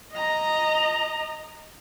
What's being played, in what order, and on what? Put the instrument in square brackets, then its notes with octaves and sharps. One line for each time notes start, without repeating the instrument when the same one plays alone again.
[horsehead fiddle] D#5 A#5